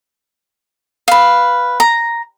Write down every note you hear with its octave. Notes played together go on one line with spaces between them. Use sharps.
B4 F5
A#5